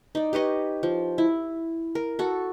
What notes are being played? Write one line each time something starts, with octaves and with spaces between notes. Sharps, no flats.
D#4 D5
G4 B4 C#5 D#5
F3
E4
A#4
F#4 A4